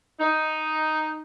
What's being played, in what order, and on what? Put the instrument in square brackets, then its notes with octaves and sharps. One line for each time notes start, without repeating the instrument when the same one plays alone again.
[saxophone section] D#4